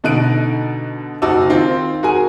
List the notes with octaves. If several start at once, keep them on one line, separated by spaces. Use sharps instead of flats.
B2 D3 D#4 F#6 D7
F#1 D#4 F#4 A5 D6 E6
D#3 C4 F4
F#4 G#4 A#4 G#5